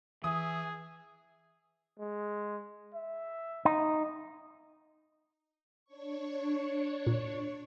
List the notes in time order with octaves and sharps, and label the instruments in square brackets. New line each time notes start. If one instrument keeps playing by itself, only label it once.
[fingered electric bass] E3 [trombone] G#4 [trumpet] E5 [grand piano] D#6
[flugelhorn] G#3
E5
[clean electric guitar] D#4
[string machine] D4 C#5 C#6
[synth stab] A#2